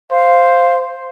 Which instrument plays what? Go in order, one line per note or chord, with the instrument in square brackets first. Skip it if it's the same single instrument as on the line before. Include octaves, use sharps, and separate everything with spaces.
[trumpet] C5 [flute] F5